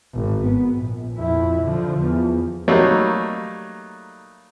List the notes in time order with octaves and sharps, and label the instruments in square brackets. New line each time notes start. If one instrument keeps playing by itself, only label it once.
[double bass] G#1
B3
A#1
F2 E4
D3 F3
E2
[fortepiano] F#3 G3 A3 A#3 D#4